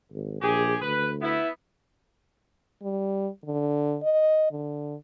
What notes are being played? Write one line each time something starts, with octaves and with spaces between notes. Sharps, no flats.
G#1
A#1 G4 G#4
D2 B4
B3 E4
G3
D3
D#5
D3